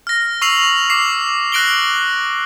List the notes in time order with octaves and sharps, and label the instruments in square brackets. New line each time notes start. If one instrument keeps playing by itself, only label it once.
[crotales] F6 A#6
C#6 E6 C7 F7 F#7
D6 C7
F#6 A#6 D7 F#7 G7